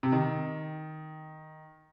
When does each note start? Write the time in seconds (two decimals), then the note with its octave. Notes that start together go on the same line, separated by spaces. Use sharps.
0.03 C3
0.12 D#3